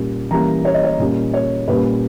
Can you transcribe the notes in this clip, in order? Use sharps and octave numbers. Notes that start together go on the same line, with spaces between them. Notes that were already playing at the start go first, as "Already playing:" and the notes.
Already playing: A#2 G3 C#4
E3 G3 A#3 C#4 A#5
C#5
D#5
C#5
A#2 G3 C#4
C#5
A#2 G3 C#4 B4